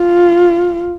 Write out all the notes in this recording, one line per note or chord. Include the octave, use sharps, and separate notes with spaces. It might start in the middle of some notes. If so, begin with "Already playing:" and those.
Already playing: F4